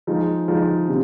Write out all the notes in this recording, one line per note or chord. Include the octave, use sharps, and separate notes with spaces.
F3 G#3 D#4
F3 G#3 D#4
C3 F3